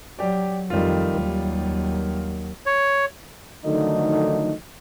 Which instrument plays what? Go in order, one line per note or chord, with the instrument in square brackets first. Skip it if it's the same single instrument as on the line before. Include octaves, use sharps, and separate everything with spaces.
[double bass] F#3 [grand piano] G4 D5
[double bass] F2 D#3 [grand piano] G3 F4
[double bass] D#2 F#3
[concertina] C#5
[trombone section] D3 D#3 F3 F#3 A3 D#4